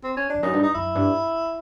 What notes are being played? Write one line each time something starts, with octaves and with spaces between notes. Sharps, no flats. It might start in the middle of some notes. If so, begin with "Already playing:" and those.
C4
C#4
F2 D4
F#2 D#4
G2
D#4
F#2 E4
G2